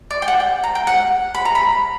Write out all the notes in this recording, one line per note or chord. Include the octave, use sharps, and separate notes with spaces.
D5
G5
F#5
G5
A#5
G5
F#5
B5
A#5
B5